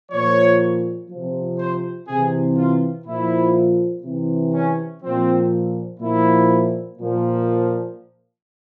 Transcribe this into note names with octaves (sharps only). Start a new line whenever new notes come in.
A#2 F3 C#5
C3 F3
C5
C3 E3 G#4
F4
A#2 F3 E4
C3 E3
C#4
A#2 F3 C4
A#2 F3 E4
A#2 F3